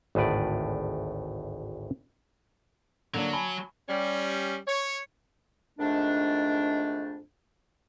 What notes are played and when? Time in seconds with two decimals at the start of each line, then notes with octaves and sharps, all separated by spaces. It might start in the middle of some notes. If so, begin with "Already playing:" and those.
0.15 G#1 D2 A2 B4 D5
3.14 D3 F#3 A#3 D4
3.33 G#5 A5 B5
3.89 G3 C#4
4.67 C#5
5.78 F2 G#2 D#3 A3 D4